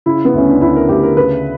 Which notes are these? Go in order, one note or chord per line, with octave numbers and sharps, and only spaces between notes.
C#3 E4
B3
D2 C#4
D4
D2 E4
A#4
D2 G4
A#4
C#3 B4